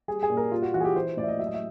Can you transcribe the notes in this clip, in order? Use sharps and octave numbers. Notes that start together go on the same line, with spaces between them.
G3 G#4
G#4
A#2
A#4
G3 F4
F#4
E3 F#4
G#4
G4
E3 C5
A2 D5
E5
D#5
F#3 E5
D#5
E5